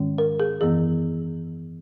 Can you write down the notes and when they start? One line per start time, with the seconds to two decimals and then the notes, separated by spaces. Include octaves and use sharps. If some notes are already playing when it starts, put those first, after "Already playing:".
Already playing: G#2 D#3 G#3 C#4
0.18 A#4
0.40 G#4
0.61 F#2 E3 B3 G#4